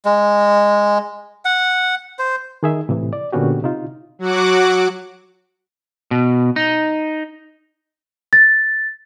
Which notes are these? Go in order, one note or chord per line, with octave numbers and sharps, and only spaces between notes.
G#3
F#5
C5
D#3 G#4 E5
A2 C3 E3
D5
A#2 D3 B3 C#4 F#4 G4
C3 D#4 F4
F#3 F#4 F#5 D6
B2
D#4
A6